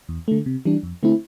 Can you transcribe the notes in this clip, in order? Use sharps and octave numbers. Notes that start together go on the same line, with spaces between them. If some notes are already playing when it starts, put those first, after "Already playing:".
E2
D3 A3
C3
E3 G3 D4
F2
D3 A3 C4 E4